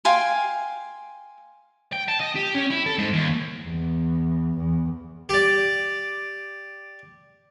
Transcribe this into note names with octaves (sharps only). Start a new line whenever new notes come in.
F5 G5 G#5 C6
G5
A5
D#5
G4
C#4
E4
A4
G#2
D#2
E2
E2
G4 D5